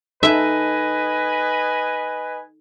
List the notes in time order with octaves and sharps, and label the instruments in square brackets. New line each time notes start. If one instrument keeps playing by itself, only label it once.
[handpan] D#4 A4 [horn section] B4 D#5 G#5 [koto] E5